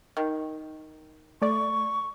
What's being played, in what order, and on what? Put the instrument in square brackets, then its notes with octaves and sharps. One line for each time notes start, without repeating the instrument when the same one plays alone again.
[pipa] D#3
[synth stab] A3 D5 [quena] C#6